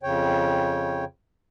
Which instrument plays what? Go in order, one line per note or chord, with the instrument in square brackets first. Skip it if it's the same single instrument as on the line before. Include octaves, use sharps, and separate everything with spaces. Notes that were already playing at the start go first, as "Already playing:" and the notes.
[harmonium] F2 C#3 C#5 G5